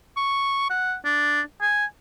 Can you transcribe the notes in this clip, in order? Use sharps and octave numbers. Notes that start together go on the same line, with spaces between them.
C#6
F#5
D4
G#5